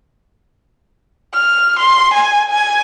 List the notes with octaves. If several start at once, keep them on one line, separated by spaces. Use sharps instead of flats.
F6
C6
G#5
G#5